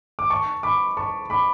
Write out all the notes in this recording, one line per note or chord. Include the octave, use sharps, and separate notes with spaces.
D6
A5 C#6
B5 D6
A5 C#6
B5 D6